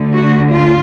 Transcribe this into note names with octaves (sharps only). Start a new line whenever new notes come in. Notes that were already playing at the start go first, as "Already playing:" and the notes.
Already playing: D2 D3
F#4
F4